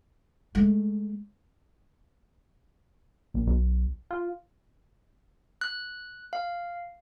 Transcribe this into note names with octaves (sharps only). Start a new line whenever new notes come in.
G#3 A3
A#1
B1
F4
F#6
F5